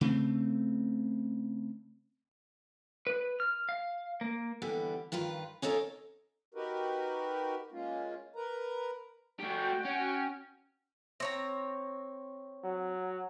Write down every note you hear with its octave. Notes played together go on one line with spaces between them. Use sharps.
C#3 A3 C4
B4
F6
F5
A#3
D3 E3 G3 B3
G2 D#3 F4 B4
C#4 D#4 F4 A4 A#4 C#5
D#4 F#4 G4 A#4 B4
G#3 A#3 C#4 F4
A#4 B4 A#5
A3 F#4 G4 G5
C#4
C4 C#5 A#5
F#3